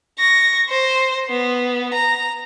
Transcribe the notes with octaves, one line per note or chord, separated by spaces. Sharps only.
C#6 A#6
C5
B3
A#5